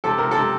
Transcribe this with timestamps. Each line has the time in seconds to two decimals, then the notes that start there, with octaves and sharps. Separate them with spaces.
0.04 C3 A4
0.18 C3 A#4
0.31 C3 A4